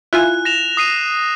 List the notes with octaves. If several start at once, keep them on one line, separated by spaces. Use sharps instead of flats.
E4 F4 G#5 F#6
A#6 E7 F7
D#6 C7 D#7